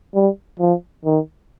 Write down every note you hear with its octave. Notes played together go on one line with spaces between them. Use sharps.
G3
F3
D#3